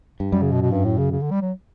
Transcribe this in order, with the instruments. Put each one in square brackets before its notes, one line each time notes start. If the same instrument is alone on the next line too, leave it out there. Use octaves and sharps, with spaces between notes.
[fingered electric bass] G2
[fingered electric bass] F#2 [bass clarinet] G3
[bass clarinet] C#3
B2
B2
G2
A2
C#3
C#3
D3
G3
F#3